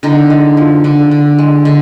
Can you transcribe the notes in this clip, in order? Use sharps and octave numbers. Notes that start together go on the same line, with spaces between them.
D3 D#4
G#3
F3
D3
D3
G#3
D3